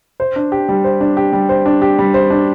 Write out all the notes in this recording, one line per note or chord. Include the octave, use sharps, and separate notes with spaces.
C5
D4
G4
G3
C5
D4
G4
G3
C5
D4
G4
G3
C5
D4